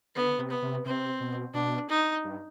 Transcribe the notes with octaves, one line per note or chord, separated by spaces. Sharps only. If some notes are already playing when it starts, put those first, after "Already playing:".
D3 B3
C3
B3
C3
C3 C4
B2
B2 D4
D#4
G2